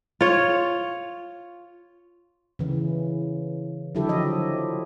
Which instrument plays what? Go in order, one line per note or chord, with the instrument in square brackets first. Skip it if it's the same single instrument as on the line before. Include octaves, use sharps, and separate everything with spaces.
[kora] F4 C#5
[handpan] C#3 E3
D3 F#3 E4 G4 A4
F3 D#5